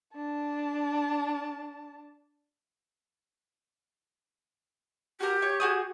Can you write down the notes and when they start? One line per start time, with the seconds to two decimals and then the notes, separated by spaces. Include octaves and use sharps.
0.15 D4 A5
5.20 F#4 G4 A#4
5.42 C#5
5.60 F#4 G#4 D#6